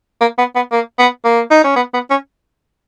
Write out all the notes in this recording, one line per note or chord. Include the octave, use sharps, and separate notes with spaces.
A#3
B3
B3
A#3
B3
A#3
D#4
C#4
B3
B3
C#4